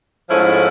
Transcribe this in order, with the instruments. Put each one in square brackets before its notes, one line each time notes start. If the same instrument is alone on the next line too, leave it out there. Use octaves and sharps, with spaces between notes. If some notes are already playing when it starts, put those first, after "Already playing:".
[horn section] G#2 F3 A3 C#4 E4